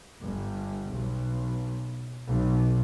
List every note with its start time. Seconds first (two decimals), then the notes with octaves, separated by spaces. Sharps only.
0.23 G1
0.91 B1
2.28 B1